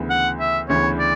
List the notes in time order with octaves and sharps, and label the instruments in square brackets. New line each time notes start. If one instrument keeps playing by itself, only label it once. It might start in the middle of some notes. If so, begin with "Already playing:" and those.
Already playing: [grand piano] D2 C#3 E3 B3
[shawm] F#5
E5
[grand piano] D2 C#3 E3 B3 [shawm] C#5
[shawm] D5